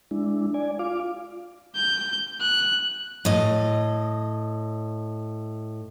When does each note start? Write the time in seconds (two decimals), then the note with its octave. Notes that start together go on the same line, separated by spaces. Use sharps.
0.11 G#3 D4 E4
0.54 D5 G#5
0.79 F4 F5 D6
1.76 G6
2.41 F#6
3.25 A2 D#5